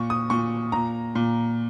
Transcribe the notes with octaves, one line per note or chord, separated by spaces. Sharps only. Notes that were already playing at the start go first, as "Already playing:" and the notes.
Already playing: A#2 C#6
D#6
A#2 C#6
A#2 A#5
A#2